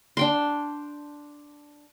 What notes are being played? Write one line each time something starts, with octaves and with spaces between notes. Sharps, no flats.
D4 G5 C6